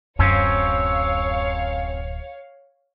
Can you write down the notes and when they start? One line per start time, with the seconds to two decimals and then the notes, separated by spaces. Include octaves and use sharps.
0.19 D1 F#2 F#3 C4 C#4 C#5 F5